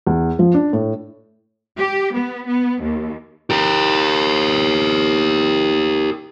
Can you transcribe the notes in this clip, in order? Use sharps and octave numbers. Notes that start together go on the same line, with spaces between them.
E2
F3
D4
A2
G4
B3
B3
D#2
G4 A#4